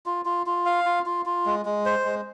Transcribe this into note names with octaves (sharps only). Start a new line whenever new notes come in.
F4
F4
F4
F5
F4
F4
F4
G#3
G#3
C5
G#3